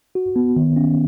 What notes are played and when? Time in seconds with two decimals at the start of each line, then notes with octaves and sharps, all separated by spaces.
0.15 F#4
0.36 B3
0.56 D#3
0.76 C#4